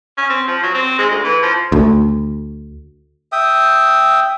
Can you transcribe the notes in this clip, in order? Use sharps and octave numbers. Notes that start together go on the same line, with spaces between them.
C#4
C4
F3
F#3
C4
G#3
D2
E3
F3
D2
E5 G5 D#6